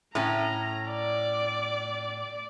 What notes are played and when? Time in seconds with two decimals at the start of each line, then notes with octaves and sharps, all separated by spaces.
0.15 A2 C#4 A#5
0.90 D5